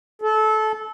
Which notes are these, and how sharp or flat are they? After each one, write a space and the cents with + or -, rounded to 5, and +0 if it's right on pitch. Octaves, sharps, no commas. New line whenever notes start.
A4 -20